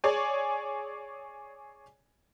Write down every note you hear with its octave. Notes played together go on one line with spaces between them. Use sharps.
G#4 C#5 D5 G#5